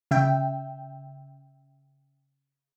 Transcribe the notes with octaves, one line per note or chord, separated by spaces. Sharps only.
C#3 E5 G5